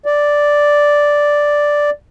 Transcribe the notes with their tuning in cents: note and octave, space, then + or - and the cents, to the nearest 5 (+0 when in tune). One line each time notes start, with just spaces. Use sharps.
D5 +0